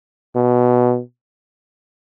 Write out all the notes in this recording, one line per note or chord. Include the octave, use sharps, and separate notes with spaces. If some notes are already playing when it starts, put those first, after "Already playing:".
B2